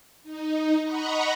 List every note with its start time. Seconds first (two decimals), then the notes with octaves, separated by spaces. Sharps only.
0.24 D#4
0.83 D#5 F#5 A#5 B5 C#6